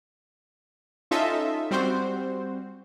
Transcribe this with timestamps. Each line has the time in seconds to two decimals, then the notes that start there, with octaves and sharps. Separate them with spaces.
1.11 C#4 D#4 F4 A4 D#5 E5
1.71 G3 C4 F#4 C5